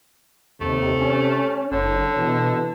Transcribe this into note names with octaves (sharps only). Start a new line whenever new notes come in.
D#2 C3 A3
C#4
F#1 D3 C#5
B2 E3